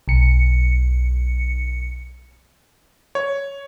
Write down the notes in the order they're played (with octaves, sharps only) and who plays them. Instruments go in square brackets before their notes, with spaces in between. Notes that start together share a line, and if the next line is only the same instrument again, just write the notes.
[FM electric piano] B1 C#7
[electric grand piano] C#5